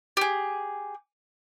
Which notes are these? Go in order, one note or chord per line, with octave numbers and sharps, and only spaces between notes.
G4 G#4